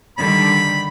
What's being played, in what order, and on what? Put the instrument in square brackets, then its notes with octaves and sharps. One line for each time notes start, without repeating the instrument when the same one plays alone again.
[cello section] D3 D#3 G3 [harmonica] B5